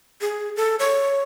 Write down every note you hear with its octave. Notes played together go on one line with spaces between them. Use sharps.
G#4
A4
C#5